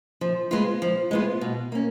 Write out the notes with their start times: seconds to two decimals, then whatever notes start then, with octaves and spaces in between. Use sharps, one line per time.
0.21 F3
0.51 G#3 B3 F4
0.82 F3
1.11 G#3 B3 F4
1.41 B2
1.72 A#3 C#4